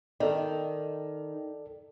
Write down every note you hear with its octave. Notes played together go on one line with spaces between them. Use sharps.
D#3 A4 D5